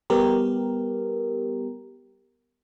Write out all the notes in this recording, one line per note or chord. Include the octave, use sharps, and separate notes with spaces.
G3 B3 G4 A#4